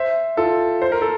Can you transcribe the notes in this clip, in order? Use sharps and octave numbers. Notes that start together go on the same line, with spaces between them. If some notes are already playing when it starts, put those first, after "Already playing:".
Already playing: C5 E5
F4 A4
C5
A#4
A4